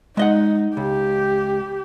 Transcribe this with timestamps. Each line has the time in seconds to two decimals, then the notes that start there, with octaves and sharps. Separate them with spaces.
0.17 G#3 D#4 D#5 F#5
0.77 C#2 G4